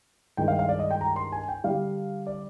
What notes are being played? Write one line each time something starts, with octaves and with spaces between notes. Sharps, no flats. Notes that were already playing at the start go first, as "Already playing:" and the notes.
G2 D#3 G#3 G5
F5
F5
D5
D#5
G5
A#5
C6
G#5
G5
D3 G3 D4 F5
D5